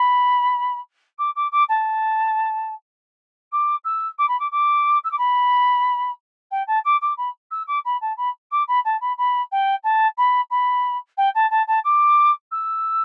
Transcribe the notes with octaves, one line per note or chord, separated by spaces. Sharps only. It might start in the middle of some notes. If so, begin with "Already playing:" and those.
Already playing: B5
D6
D6
D6
A5
D6
E6
D6
B5
D6
D6
E6
D6
B5
G5
A5
D6
D6
B5
E6
D6
B5
A5
B5
D6
B5
A5
B5
B5
G5
A5
B5
B5
G5
A5
A5
A5
D6
E6